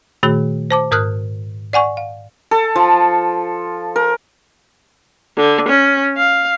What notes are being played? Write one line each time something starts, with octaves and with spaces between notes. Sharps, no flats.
A#2 D#3 A3 F#4 G#4
C5 A5 D6
G#2 A#4 D#6 F6 F#6
D5 F#5 G#5 C#6
F5
A4
F3
A#4
D3
C#4
F5